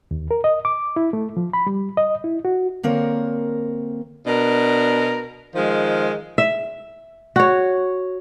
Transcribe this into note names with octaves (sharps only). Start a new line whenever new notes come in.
D#2
A#4
D#5
D6
E4
A3
F3
B5
G3
D#5
E4
F#4
D3 A#3 C4 A#4 C#5
B2 D4 A#4
D#3 F3 G#3
E5
F#4 C#5